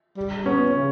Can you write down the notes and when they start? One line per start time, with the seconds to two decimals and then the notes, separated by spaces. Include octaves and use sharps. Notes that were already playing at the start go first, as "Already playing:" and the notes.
0.17 G3
0.45 B3 C#4
0.75 C#3